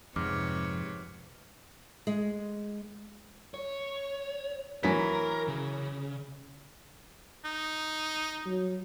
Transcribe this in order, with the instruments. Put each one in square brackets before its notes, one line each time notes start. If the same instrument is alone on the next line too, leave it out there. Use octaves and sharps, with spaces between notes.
[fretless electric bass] F2 [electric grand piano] G#2 [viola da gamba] C3 B4 C#5 [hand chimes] D6 F6
[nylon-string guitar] G#3
[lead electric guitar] C#5
[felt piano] E3 F#3 B6 [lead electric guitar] A#4
[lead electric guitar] C#3
[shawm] D#4
[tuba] F#3